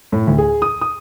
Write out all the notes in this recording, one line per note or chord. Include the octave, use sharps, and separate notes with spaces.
A2
D2
G#4
D#6
D#6